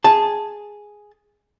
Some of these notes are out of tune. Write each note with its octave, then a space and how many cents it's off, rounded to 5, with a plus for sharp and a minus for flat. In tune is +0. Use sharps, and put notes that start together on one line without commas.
G#4 +0 A5 +0